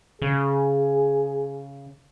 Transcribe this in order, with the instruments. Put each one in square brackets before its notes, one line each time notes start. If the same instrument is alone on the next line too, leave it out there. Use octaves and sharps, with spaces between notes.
[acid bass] C#3 [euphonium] G#4